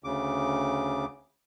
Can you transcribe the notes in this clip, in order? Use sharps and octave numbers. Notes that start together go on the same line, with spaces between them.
D2 C#3 D6